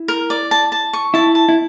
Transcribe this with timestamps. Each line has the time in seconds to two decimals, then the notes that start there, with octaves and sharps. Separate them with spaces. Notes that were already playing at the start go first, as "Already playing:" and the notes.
Already playing: E4
0.08 A#4
0.30 D5
0.51 A5
0.72 A5
0.93 C#6
1.14 E4 A5
1.35 A5
1.49 E4